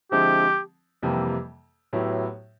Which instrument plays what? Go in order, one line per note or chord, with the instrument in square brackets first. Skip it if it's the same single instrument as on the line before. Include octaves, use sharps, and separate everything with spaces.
[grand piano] D3 F3 G#3 C4 E4 [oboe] G4
[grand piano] F2 C3 E3 G3 A#3
A2 F#3 B3 E4 G4